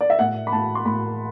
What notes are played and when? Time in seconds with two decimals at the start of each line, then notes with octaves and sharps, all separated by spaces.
0.01 D5
0.10 E5
0.19 A2 F#5
0.47 B5
0.52 A2 A5
0.75 C6
0.85 A2 B5